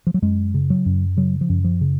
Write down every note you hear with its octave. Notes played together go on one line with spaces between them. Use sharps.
F3
F#3
F#2 G#3
C#3
F#3
F#2
C#3 F#3
F3
F#2
F3
C#3